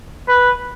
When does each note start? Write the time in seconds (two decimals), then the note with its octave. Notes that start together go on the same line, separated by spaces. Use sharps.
0.28 B4